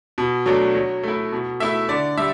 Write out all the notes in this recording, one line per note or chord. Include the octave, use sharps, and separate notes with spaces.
B2
F#3 A3 D4
F#3
A3 E4
B2
A3 E4 E5
D3 D5
G3 E5